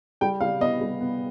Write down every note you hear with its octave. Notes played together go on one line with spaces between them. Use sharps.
G3 G5
G3 F5
B3 D#5
G3
B3